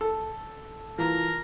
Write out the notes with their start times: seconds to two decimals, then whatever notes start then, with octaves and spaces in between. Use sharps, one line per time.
0.01 A4
0.98 E3 F4 A#4 A#5